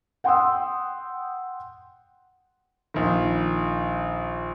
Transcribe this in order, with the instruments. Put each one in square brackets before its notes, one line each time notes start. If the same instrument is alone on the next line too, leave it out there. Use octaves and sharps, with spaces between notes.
[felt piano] F#5 G5 C6 D#6 E6
[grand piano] A#1 D#3